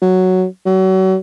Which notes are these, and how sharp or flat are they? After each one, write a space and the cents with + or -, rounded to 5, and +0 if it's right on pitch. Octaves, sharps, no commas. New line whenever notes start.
F#3 +0
F#3 +35